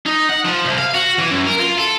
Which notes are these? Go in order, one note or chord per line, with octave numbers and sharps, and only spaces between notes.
D#4
F#5
F3
C2
F5
F#4
E3
F#2
A#4
F4
A4